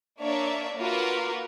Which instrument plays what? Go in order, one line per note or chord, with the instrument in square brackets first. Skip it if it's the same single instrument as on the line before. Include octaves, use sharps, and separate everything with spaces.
[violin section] A#3 D4 C#5 D5 E5
A#3 F4 F#4 A#4 B4